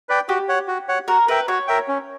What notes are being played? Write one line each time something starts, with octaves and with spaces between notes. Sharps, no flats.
B4 D5 G5
F#4 G4
C#5 F#5
F#4
C#5 F#5
F#4 A#4
A#4 B4 E5 G5
F#4 C#5
A#4 E5 G5
C#4